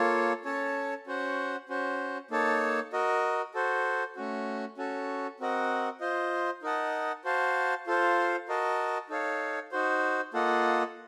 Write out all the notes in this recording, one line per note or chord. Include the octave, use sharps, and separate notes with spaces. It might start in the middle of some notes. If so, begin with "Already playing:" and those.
Already playing: A#3 F4 A4 C#5
C#4 A4 C#5 A5
C#4 F#4 C5 F#5
C#4 F#4 C5
A#3 D#4 A4 C#5 A5
F#4 A#4 D#5
F#4 A4 C5
A3 C#4 F#4
C#4 F#4 A4
C4 F#4 A#4 D#5 F#5
F4 C5 D#5
D#4 A#4 D#5 F#5 A5
F#4 C5 F5 A5
F4 A4 C5 F5
F#4 A#4 D#5 A5
D#4 A4 C#5 F5
D#4 F#4 C5
A#3 F4 A4 D#5 F#5